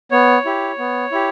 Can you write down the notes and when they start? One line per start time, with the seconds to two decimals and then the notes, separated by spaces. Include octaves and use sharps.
0.11 B3 C#5
0.45 E4 G4
0.78 B3
1.12 E4 G4